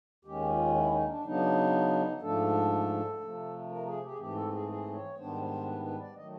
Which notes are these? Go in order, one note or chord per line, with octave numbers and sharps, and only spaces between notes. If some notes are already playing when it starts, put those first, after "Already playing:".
D#2 D#3 G#3 C#4 G4
F4
E4
D#4
D4
C#3 F#3 B3 D4 D#4
G#2 F3 A3 D4 A4
C3 F3 A3
A#4
G#4
G4
G#4
G#2 E3 A3 C4 G4
A4
G#4
G#4
C#5
G#2 D#3 G3 B3 D4 C5
C5
B4
B4
D5
D#3 F#3 A3 D#5